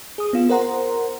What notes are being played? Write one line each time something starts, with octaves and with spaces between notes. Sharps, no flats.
G#4 D#6
B3 F4
A#4 C5 F#5 A#5 C6